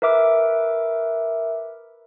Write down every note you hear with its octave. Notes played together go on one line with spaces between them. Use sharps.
A#4 B4 E5 D6 F6